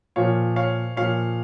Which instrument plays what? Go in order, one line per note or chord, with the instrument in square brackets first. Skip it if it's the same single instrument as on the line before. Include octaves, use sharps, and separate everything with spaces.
[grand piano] A#2 F3 C#5 F5
C#5 F5
A#2 F3 C#5 F5